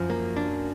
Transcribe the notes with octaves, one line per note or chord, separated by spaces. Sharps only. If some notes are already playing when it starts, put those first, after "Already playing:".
Already playing: F#2 F3
A#3
D4